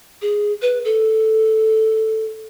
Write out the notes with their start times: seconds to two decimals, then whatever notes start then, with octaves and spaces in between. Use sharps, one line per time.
0.22 G#4
0.62 B4
0.85 A4